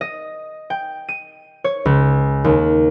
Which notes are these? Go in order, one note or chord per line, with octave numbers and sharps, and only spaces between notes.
D#5
G5
D#7
C#5
C#2
D#2